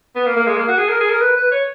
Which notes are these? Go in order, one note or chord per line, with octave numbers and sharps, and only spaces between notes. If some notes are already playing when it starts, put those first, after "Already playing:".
B3
A#3
A#3
G#3
A#3
F#4
G#4
A#4
G#4
A#4
B4
B4
C#5